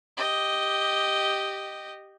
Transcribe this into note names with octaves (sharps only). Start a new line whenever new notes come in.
G4 D#5